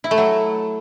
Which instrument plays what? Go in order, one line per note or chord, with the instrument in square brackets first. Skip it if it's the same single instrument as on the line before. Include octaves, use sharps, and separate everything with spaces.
[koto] E4
A3
F#3